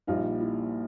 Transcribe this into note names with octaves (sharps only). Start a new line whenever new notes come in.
A#1 A#2 G3 D#4 F4
E4